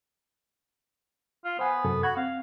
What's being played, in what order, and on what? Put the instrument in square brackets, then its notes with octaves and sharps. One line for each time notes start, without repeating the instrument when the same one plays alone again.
[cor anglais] F4
[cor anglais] B3 [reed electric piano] C5 F#5 G#5
[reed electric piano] F#2 C3 A4
[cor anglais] F#4 [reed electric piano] B5 G#6
[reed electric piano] C4 [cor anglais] F5